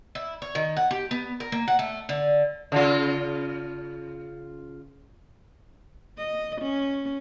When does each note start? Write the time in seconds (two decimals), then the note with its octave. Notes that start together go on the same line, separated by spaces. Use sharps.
0.15 E4
0.42 C#5
0.55 D#3
0.77 F#5
0.91 G4
1.11 B3
1.40 A#4
1.52 A#3
1.68 F#5
1.79 A3
2.09 D3
2.72 C#3 F4
6.18 D#5
6.61 C#4